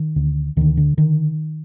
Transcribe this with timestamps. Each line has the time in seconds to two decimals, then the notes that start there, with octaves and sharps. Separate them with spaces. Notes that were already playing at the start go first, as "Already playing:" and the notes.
Already playing: D#3
0.16 D2 D3
0.57 D2 D3 D#3
0.77 D3
0.97 D3 D#3